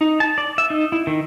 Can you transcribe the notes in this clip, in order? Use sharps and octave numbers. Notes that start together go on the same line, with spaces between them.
D#4
A5
D5
E5
D#4
E4
D#3